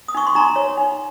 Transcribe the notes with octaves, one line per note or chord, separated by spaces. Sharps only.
D#6
D#4 C#6
C6
D#4 A#5
C#5
D#4